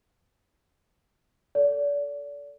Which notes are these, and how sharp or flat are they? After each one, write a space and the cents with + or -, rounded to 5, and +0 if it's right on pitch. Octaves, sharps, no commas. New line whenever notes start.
A4 +10 D5 -35